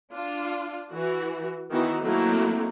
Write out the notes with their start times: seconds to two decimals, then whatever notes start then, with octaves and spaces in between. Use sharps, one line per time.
0.12 D4 F4
0.93 E3 F#4
1.70 D#3 E3 B3 D#4 E4 F#4
2.01 F#3 A3 A#3 C4 D#4 E4